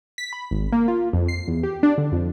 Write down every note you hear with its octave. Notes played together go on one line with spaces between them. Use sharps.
B6
B5
G#1
A#3
F4
F2
C7
E2
G4
D4
D3
F2